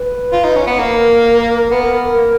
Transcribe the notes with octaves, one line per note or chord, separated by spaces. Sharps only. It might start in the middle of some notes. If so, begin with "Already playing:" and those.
Already playing: B4
F4
D#4
C#4
B3
A#3 A#4
B3 B4
A#4
A#4
A#4
A#3